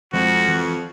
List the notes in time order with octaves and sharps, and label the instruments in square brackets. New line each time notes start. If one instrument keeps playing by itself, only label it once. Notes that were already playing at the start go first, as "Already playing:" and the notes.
[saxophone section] F2 [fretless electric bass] F3 G#3 [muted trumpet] F#4
[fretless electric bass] E3